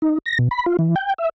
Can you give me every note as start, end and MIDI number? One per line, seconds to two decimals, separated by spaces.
0.02 0.18 63
0.26 0.38 94
0.39 0.48 47
0.51 0.66 83
0.66 0.77 65
0.79 0.95 52
0.96 1.14 79
1.18 1.29 76